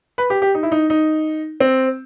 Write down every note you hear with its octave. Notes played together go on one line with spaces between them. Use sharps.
B4
G4
G4
D#4
E4
D#4
D#4
C4